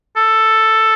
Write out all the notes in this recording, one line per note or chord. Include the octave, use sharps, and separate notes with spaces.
A4